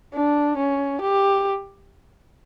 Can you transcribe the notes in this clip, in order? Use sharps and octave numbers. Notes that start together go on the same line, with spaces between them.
D4
C#4
G4